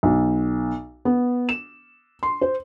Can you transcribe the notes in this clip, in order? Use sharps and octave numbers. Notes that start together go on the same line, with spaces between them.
B1
B3
E7
C6
C5